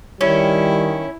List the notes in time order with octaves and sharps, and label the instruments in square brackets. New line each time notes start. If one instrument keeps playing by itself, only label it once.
[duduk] D#3 [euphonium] G3 [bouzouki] C#4 [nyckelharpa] E4